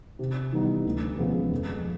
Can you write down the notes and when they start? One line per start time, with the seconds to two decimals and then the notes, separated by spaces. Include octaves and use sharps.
0.19 C3
0.52 E3 G3 B3 D#4
0.85 D2
1.18 C#3 F3 G#3 B3
1.52 F2